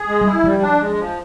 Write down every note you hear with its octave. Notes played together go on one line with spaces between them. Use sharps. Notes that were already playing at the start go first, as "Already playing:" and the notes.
Already playing: G#4
G#3
G3
E4
F3 G3
D4
G#3
F3